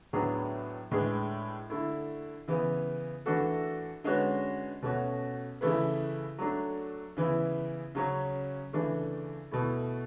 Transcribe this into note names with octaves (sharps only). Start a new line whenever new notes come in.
A2 F#3 B3 D4 G#4
A2 G#3 D4 G#4 B4
D3 A3 E4
C#3 E3 B3
E3 A3 D4 F#4 A4
D3 G#3 C#4 F#4 B4
B2 A3 C#4 F#4
C#3 E3 A3 E4 B4
F#3 A3 D4
C#3 E3 B3 E4
C#3 F#3 C#4
C#3 E3 A3 D4
B2 A3 E4